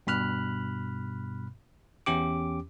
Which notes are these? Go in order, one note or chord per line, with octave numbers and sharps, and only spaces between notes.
G2 B2 B5 F6 F#6
E2 C#4 G4 D6